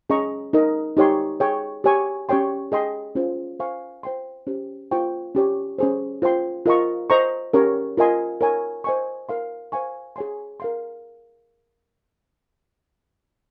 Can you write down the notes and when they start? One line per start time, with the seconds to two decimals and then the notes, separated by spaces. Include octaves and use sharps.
0.10 C#4 G#4 D#5 A#5 C#6
0.53 D#4 A#4 D#5
0.97 D#4 G4 C#5 G5 C6
1.40 G#4 C#5 G5
1.84 G4 C#5 G#5 C#6
2.29 C#4 G4 C#5 G5 C6
2.72 G#4 D#5 G5 C6
3.15 C#4 F4 C5
3.59 C5 F5 G#5 C#6
4.03 C5 G5 C6
4.47 C#4 G4 C5
4.91 F4 C5 G5 C#6
5.35 C#4 G4 C#5
5.78 C#4 G#4 C5
6.22 F4 C5 G5 C6
6.66 F4 A#4 D#5 A#5 C#6
7.10 C5 D#5 A#5 C#6
7.53 C#4 G4 A#4 C#5
7.97 F4 A#4 D#5 G#5 C6
8.41 A#4 C#5 G#5
8.84 C5 D#5 G#5 C#6
9.29 A#4 F5 C6
9.72 C5 F5 G#5 C#6
10.16 G#4 C#5 G#5 C6
10.60 A#4 F5 C6